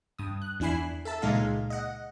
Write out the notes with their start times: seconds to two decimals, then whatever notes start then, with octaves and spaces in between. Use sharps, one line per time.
0.19 G2 D#6
0.42 F#6
0.60 E2 D4 E4 G#5 B5 C7
1.05 A4 E5 A5
1.22 C#2 A#2 G#3 D#4 E5 F5
1.70 D#5 F#5